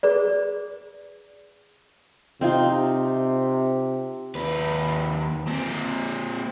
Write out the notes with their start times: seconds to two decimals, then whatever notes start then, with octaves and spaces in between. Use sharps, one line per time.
0.03 G#4 B4 D5
2.41 C3 C4 D#4 F4
4.35 D#2 B4
5.47 A#2 C4